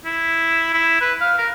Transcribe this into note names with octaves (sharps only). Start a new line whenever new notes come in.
E4
E4
B4
F5
A#4